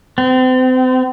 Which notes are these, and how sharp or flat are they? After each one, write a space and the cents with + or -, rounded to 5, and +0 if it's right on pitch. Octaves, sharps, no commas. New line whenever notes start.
C4 -35